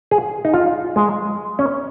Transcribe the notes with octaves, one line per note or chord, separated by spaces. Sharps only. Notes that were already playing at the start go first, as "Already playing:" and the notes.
G#4
D#4
F4
G#3
C#4